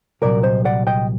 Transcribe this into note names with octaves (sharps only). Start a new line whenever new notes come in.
C2 A#2 F#3 A#4 D5
C5 D#5
D5 F#5
D#5 G5